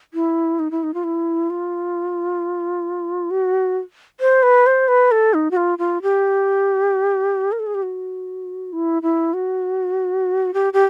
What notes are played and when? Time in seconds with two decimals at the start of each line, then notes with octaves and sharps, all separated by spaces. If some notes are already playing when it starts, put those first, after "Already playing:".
0.14 E4
0.59 D#4
0.71 E4
0.83 D#4
0.94 F4
1.04 E4
1.50 F4
3.30 F#4
4.20 C5
4.43 B4
4.67 C5
4.88 B4
5.11 A4
5.34 D#4
5.51 F#4
5.57 F4
5.78 F4
6.02 G4
7.52 A#4
7.60 A4
7.67 G#4
7.75 G4
7.83 F#4
8.73 E4
9.02 E4
9.34 F#4
10.54 G4
10.73 G4